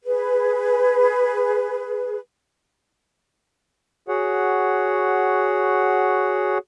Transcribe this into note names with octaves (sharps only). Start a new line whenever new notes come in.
G#4 B4
F#4 G#4 C#5 F#5